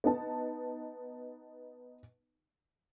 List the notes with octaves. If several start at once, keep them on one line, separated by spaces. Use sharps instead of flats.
B3 D#4 A5